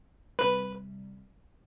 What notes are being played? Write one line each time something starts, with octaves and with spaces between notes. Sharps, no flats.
C3 G3 B4